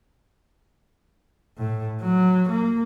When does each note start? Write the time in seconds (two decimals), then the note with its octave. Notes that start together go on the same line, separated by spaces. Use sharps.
1.57 A2
2.01 F#3
2.49 A#3